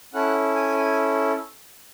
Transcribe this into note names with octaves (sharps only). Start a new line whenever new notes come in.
C#4 E4 A4 F#5
G#5
G#5